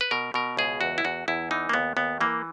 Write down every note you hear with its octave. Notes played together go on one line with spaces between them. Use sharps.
B4
B2 A#4
B2 A#4
C#2 G#4
E2 F#4
E4
E2 F#4
E2 E4
E3 D#4
A#3
D#2 B3
D#2 B3
E3 A#3